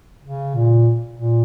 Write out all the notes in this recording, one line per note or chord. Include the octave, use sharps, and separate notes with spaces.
C#3
A#2
A#2